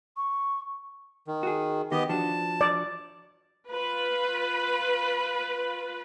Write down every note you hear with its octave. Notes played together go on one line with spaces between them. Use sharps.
C#6
D#3
F#4 G#4
D#3 B3 G4 D#5
F3 D4 F#4 A5
D5
F4 B4